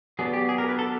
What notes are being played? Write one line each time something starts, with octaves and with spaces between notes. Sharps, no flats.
F#3 B3 D4 G#4
G4
G#4
A#4
B4
A4